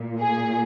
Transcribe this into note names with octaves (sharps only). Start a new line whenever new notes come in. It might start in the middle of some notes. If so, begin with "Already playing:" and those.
Already playing: A#2
G#4